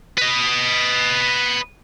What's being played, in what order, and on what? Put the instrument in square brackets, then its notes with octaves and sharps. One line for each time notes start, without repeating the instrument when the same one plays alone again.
[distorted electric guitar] B4 D#5